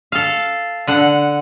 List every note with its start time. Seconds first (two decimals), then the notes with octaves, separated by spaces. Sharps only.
0.12 A4 F5
0.87 D3 F#5